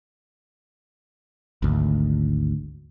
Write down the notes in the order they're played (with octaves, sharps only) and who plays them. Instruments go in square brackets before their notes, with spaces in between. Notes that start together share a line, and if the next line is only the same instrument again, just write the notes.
[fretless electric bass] G#1 D2